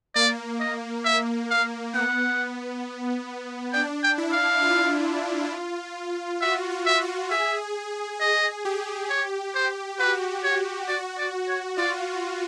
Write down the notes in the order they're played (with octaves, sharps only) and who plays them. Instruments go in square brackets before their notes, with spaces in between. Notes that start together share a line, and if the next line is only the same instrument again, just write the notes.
[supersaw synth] A#3 [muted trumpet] D5
[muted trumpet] D#5
E5
F5
[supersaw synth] B3 [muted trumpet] F#5
[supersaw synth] D4 [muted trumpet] G5
[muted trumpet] G5
[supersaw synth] E4
[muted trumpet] F5
[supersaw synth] F4
[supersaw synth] F#4 [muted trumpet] E5
[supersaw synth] F4
[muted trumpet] E5
[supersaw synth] F#4
[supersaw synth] G#4 [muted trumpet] E5
[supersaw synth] G#4 [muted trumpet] D#5
[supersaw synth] G4
[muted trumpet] C#5
C5
[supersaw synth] F#4 [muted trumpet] B4
[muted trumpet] C#5
[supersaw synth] F#4 [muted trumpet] D5
[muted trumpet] D5
C#5
[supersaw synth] F4 [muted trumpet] D5